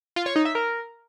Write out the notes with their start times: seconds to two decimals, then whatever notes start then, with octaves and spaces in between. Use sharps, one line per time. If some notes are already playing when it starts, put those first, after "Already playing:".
0.16 F4
0.26 C#5
0.36 D#4
0.45 E5
0.55 A#4